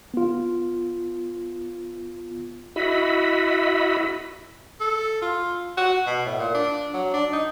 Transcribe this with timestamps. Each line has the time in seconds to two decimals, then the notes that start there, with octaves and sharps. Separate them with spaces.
0.14 B3 F4
2.76 E4 F#4 D#5 E5 B5
4.81 A4
5.22 F4
5.77 F#4
6.06 B2
6.26 A2
6.39 A#2
6.54 D4
6.94 F#3
7.13 D4
7.33 D#4